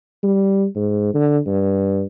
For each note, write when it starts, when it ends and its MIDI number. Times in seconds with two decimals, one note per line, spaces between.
0.24 0.66 55
0.76 1.12 44
1.15 1.39 50
1.47 2.03 43